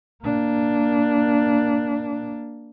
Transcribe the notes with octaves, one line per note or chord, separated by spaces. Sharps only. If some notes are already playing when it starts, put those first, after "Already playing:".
A#3 D4